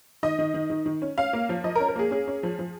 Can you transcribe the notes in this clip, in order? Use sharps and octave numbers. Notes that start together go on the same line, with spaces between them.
D#3 D#5
D#3
D#3
D#3
D#3
C#4
C#4 F5
A#3
F3
F3 D#5
A#4
C#4
A#4
A#3 G#4
C#4 G#4
C#4
F3
F3